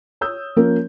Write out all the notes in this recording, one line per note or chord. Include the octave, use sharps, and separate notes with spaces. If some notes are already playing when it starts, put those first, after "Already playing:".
C#5 D#6 E6 G6
F3 A#3 C#4 A#4